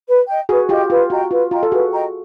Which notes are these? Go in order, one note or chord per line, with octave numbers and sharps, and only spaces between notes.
B4
D#5 G5
F#4 G#4 B4
F4 G4 D#5 G5
F4 B4
F#4 D#5 G5 A#5
F4 B4
F4 D#5 G5 A#5
A4
F#4 G#4 B4
D#5 G5 A#5